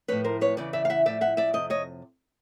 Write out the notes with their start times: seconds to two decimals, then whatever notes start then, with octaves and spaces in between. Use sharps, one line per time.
0.08 A2 F3 B4 C#5
0.24 A#4 C5
0.41 B4 C#5
0.57 E2 C#3 E3 D5
0.73 D5 E5
0.85 F5
0.90 E5 F#5
1.06 A2 F3 D5 E5
1.21 E5 F#5
1.37 D5 E5
1.53 F2 C3 D#5
1.70 C#5 D#5